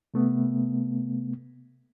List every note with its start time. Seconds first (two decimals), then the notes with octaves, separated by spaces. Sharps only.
0.14 C3 A3 B3